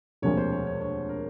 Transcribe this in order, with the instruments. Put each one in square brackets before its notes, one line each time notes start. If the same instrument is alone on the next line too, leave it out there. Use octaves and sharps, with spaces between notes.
[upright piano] E1 D2 C3 F3 A#3 [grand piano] C#5
[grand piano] C5
C#5
C#5
C#5
A#4